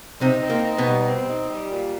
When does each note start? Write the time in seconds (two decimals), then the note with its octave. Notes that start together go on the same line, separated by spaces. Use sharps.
0.21 C3 C4 D#4
0.43 C4
0.50 A#3
0.64 D#4
0.78 B2 B3
0.85 G3
1.07 C4
1.29 D#4
1.49 G3
1.71 A#2